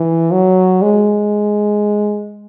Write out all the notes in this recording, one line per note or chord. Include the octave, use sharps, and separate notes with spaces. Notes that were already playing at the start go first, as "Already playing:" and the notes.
Already playing: E3
F#3
G#3